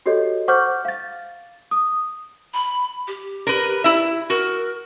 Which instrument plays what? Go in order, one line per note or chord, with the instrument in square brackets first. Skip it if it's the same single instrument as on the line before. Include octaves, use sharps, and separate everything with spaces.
[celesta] F#4 G4 A4 C#5 D#5
C5 F#5 C#6 D6 F6 G6
F5 A6
D#6
[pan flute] B5
G4
[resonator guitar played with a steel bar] A#4 B4
E4 E5
[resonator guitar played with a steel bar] F#4 [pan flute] A#4